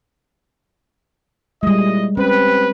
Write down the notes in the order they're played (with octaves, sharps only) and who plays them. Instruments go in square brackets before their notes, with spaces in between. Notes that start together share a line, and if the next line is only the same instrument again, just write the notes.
[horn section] A#2 E4 D#5 [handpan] G3 G#3
[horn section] C4 G4 B4 [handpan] C#4